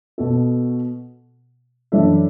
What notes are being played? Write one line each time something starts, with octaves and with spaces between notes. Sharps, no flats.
B2 B3 F#4 A4
F#2 E3 D4 A4 E5